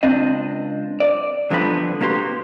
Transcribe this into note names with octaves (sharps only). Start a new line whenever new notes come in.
C#2 C4 D4 D#5
D5
C2 D3 F3 B3 E5 B5
C3 A#3 F#4 G4 B4 C6